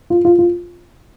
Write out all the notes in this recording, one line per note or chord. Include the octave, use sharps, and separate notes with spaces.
F4
F4
F4